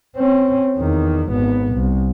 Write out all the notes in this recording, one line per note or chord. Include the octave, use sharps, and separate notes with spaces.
C4 C#4
E2 D#3
G#1 B3
C2